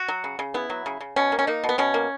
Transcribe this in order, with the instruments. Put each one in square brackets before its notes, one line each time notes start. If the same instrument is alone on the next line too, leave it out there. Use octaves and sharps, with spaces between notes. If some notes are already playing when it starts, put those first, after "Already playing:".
Already playing: [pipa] F#4
F#3
C#3
C#3
B3 E4
F#3
C#3
C#3
B2 C#4
A#3
C#4
A#3 D#4
B2
B3
B2 C#4
A#3